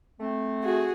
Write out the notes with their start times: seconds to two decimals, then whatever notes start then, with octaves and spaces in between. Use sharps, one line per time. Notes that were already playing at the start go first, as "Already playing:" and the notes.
0.20 A3 C4
0.64 F#4 G#4